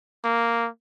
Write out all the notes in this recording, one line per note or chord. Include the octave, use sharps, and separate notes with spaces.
A#3